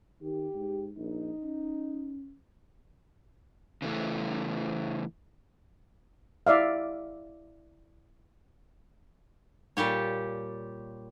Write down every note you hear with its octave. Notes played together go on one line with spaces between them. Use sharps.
D#3 G4
G#2
A#1 D#4
C#4
C#3 E3 A3 C#4
E4 D5 E5 F5
A#2 G3 G4 C#5